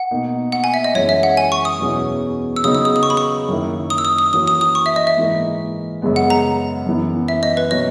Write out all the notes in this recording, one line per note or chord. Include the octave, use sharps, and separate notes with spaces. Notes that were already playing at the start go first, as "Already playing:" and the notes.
Already playing: F#5
B2 A#3 D#4
F#5
G#5
E5
D#5
F#2 E3 G#3 C#4 C#5
E5
F#5
G#5
C#6
D#6
E2 B2 F#3 C#4 E4
E6
C#3 F#3 B3 D#4 D#6
E6
D#6
D#6
C#6
B5
C#6
F#2 D#3 A#3 E4
D#6
E6
D#6
D#6
E3 A#3 C#4 F#4 D#6
D#6
D#6
C#6
E5
D#5
E5
G#2 E3 A#3
F#2 C#3 G#3 B3
F#5
A#5
F#2 E3 B3
E5
D#5
B4
B2 F#3 A#3 C#4 D#5